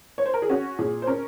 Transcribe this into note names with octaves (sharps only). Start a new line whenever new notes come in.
C#5
C5
A#4
G#4
C#4 F#4
A#2 G#4
C5
C#4 A#4